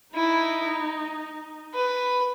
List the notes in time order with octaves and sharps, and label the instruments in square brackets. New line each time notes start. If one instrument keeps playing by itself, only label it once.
[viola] D#4 [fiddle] E4
[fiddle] B4